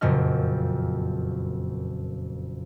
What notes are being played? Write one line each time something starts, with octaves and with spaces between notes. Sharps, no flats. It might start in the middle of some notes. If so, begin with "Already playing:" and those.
F#1 F2 A#2 F#4 D#5 F6